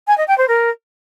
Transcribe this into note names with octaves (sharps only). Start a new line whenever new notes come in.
G#5
D#5
G5
C5
A#4